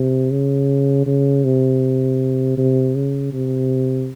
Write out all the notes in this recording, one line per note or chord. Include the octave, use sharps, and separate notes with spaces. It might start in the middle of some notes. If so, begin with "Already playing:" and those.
Already playing: C3
C#3
C#3
C3
C3
C#3
C3